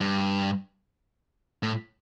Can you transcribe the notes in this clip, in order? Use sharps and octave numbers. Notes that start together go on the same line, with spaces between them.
G2
A2